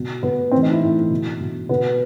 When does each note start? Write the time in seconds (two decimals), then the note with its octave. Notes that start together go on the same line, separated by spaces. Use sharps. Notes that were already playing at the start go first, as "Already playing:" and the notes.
Already playing: B2
0.23 B2 B3
0.51 A2 E3 C4
0.62 D#4
0.72 E4
0.82 A2 E3
1.11 B2
1.40 B2
1.69 B2 B3